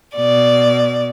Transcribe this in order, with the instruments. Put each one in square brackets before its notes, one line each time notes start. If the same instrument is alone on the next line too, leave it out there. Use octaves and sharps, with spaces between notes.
[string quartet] B2 D5